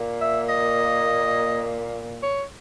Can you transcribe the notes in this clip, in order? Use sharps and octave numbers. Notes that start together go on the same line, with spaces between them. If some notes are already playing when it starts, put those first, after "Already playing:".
Already playing: A#2 A#3
E5
D#5
C#5